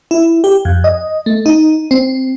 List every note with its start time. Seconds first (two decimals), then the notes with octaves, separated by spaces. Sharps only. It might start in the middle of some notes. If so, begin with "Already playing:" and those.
0.11 E4
0.44 G4
0.65 F2
0.84 D#5
1.26 A3
1.46 D#4
1.91 C4